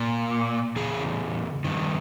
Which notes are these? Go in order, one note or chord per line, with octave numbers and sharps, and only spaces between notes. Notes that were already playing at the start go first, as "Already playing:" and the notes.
Already playing: A#2
E2 C#3 G#4
G2 D#3